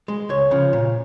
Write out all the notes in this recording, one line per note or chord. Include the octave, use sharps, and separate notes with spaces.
G#3
C#2 C#5
C#3 F3
A#2